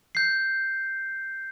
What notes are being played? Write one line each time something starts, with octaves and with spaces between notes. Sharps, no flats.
G6 C7